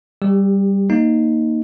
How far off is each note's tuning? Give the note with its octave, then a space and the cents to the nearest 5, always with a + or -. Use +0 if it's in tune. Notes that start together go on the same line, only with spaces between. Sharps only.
G3 +0 G4 +25
A#3 +0 D#4 +0